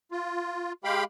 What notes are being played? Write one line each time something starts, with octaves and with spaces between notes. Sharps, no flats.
F4
G#3 G4 F5 G5 B5